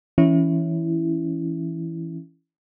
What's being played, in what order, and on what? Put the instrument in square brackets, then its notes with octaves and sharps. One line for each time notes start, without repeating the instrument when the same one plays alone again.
[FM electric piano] E3 C#4 E4